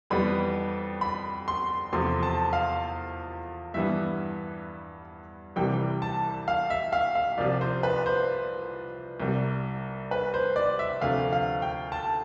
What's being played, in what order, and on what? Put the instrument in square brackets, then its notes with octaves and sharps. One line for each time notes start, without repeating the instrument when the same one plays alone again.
[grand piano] F2 E3 G3 B3 B5
B5
C6
E2 C3 F3 A3 C6
A5
F5
G2 E3 G3 B3 E5
C2 C3 E3 G3 G5
A5
F5
E5
F5
F5
C2 C3 F3 D5
C5
B4
C5
C2 C3 G3
B4
C5
D5
E5
D2 C3 F3 F5
F5
G5
A5